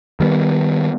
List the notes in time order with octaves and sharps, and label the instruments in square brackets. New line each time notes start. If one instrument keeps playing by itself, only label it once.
[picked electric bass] D#3 G3 B3